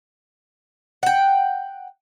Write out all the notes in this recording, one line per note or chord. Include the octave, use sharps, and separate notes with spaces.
F#5 G5